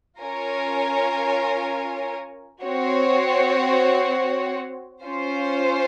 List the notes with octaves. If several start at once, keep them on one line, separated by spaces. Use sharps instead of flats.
C#4 F4 A#4 C#5 G#5
C4 F#4 C#5
C#4 F4 C5